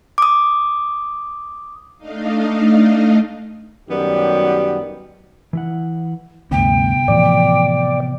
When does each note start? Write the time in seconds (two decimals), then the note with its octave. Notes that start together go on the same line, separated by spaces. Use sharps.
0.18 D6 D#6
1.98 A3 D4 D#4 D#5 F5
3.89 F#2 D#3 F#3 G3 B3 G4
5.53 E3 E4 F#5
6.51 D2 G2 C3 B3 G5
7.08 A2 E3 F3 D5